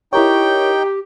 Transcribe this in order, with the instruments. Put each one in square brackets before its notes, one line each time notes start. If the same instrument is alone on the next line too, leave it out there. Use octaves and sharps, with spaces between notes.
[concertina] D#4 [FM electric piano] E4 A#4 C#5 [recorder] G4 [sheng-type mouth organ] G5